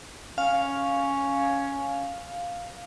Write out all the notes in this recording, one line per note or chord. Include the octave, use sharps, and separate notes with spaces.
C#4 F5